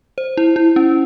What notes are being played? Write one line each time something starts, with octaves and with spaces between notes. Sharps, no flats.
C5
E4
E4
C#4